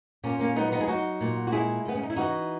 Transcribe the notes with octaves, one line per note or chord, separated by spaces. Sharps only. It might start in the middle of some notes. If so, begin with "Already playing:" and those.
A#2 A#3 C#4
A#3 C#4
F#3 B3 D#4
B3 D#4
G#4
F#3 D#4 F#4
A#2
F#4
G#3 E4 G#4
C#3 B3
C#4
D#4
E4
E3 D#4 F#4